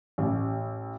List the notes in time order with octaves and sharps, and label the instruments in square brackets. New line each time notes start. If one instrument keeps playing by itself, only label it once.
[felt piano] A1